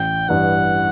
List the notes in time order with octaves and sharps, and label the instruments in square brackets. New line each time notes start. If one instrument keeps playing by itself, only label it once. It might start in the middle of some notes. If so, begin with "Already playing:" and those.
Already playing: [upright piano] A1 [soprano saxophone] G5
[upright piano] G2 E3 [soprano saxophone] F#5